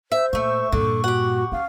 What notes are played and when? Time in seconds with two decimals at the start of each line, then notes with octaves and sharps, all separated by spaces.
0.12 C5 E5
0.33 A#2 A3 E5 C#6
0.72 G2 A#2 D3 A4
1.04 F#4 G4 F#5
1.52 C#4 F5